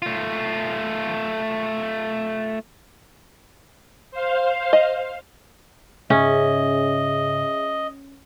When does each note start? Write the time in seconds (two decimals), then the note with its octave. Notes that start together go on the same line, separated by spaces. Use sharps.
0.02 A3 F4
4.11 C5 F5
4.73 D#5
6.10 G#2 C#3 C#4 G#4 D#5 E5